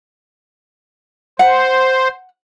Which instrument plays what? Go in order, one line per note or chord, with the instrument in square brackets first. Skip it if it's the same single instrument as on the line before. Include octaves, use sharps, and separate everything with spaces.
[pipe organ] C5 [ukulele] F#5